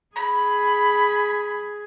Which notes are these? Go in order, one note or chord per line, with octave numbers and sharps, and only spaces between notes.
G#4 B5